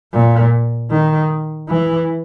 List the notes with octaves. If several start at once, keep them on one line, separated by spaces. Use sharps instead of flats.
A#2
D#3
E3